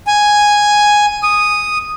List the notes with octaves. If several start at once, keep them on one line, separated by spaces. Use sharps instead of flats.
G#5
D#6